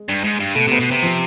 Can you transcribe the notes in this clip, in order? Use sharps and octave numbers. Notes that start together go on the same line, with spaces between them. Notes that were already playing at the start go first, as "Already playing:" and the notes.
Already playing: G#3
G2
G#2
G2
B2 A3
C3 B3
B2
C3
F3